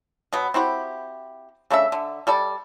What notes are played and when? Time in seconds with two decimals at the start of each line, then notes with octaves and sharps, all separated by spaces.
0.33 B2 F#3 B3
0.54 C4 E4 F#4 G4
1.70 C#3 A3 D4 E5
1.92 D3
2.27 G3 A4 D5